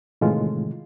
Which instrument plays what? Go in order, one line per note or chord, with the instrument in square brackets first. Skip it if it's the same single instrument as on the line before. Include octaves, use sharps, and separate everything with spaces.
[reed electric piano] A2 C3 D#3 E3 G#3 F4